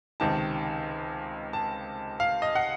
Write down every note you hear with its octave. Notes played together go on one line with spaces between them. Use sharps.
C#2 C3 D#3 A5
A5
F5
D#5
F#5